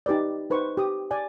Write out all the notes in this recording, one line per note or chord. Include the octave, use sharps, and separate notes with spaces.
D#4 G4 B4 D5
D#4 B4 C5 C#6
G4 D#6
D5 G#5